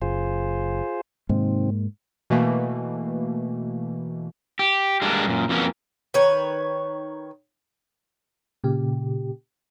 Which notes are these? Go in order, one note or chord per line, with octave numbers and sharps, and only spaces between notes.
F#1 F4 G#4 C5
G#2 C3 D#3 G#3 A#3 C4
B2 E3 A3 A#3
G4
G3 G#3 A#3 D4
F#2 A#2
F2 E3 F#3 A#3 C#4
D#3 B4 C#5
A#2 C#3 G4